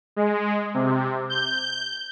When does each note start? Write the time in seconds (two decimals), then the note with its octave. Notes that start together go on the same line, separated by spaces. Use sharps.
0.16 G#3
0.74 C3
1.30 G6